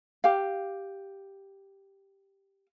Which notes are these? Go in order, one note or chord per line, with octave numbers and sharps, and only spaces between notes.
G4 F5